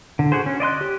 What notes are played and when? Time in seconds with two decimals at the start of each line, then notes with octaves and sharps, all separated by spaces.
0.19 D3
0.32 F#4 G#4 C5
0.46 C#4
0.60 D5 D#5 C6 F#6
0.81 G4